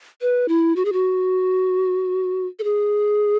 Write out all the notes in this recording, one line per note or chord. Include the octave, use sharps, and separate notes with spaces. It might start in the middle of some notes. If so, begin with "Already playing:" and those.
B4
E4
F#4
G#4
F#4
A4
G#4